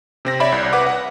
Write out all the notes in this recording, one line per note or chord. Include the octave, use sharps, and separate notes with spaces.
C3 C4 A#6
C#5 D5 E5 B5
C2
B4 F#5 D6
F#5